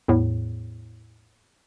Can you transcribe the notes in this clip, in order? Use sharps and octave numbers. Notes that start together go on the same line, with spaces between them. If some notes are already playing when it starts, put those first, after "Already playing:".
E2 A2